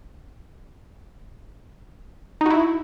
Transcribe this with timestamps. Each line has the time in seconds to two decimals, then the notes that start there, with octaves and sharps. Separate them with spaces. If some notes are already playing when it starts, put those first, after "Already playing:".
2.41 D#4
2.46 F#4
2.50 E4